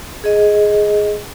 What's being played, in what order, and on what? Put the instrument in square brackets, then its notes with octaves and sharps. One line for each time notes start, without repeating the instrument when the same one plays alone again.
[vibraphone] G#4 D#5